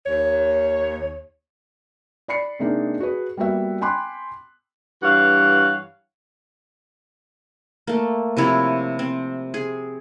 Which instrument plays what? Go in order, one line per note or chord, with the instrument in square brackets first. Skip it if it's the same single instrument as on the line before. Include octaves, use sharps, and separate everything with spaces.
[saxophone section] D#2 C#5
[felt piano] D5 B5 C7 C#7
C3 G#3 A#3 D4 D#4
F#4 G#4 B4
G3 A#3 B3 F#4 E5
G5 G#5 B5 C6 D6 F#6
[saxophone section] G2 E3 C#5 F5 F#5
[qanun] A3 A#3
C3 F3 E4 C#5
C4
G#4